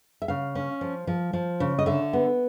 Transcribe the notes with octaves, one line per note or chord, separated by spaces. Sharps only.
E5
C#3 F5
C#4
F3
F3
F3
C#3
D#5
D3 E5
B3